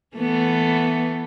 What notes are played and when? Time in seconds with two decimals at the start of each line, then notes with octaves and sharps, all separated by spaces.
0.17 E3 A3 B3